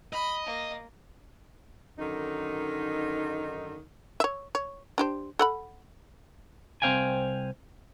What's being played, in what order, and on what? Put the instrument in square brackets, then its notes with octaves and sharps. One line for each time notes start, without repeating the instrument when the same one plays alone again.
[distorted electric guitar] D#5 [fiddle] B5
[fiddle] A#3
[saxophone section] F#2 D3 D#3 D#4
[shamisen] C#5 E5
C#5
D4 G4 C5
A4 F#5 B5
[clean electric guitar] C2 C4 C5 F5 G5 G#5